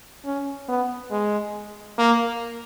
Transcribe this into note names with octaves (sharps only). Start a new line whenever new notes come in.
C#4
B3
G#3
A#3